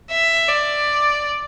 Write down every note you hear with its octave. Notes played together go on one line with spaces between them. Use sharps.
E5
D5